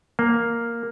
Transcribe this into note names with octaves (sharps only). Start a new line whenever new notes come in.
A#3